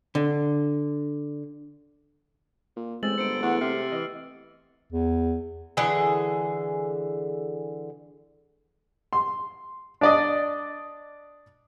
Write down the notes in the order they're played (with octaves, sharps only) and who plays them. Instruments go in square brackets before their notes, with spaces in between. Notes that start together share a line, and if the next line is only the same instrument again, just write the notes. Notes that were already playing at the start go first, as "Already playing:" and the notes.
[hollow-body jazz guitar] D3
[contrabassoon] A#2
[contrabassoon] A1 [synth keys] G#3 [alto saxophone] C4 [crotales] E6 A6 F#7
[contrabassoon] G1 [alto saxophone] C5 [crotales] C#7 D7
[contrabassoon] E2 [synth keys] A3 [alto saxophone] F#5
[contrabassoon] C3 [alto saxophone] C5 [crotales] F6 C7
[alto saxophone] E3 [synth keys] D#5
[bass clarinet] E2
[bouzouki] D3 E3 G#4 A4
[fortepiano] C6
D4 D5 D#5